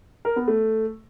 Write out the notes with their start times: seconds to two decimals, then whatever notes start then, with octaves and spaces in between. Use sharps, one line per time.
0.25 A#4
0.36 B3
0.48 A3